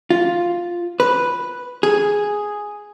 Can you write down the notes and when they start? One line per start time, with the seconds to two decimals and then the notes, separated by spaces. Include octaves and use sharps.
0.10 F4
1.00 B4
1.83 G#4